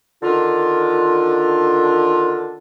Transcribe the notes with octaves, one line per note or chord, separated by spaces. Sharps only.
D3 D#3 D4 F4